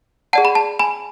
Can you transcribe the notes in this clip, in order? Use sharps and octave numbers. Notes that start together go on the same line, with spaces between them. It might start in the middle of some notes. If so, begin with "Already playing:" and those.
G#4 D5 F#5 A5
B5
A5
G#5 B5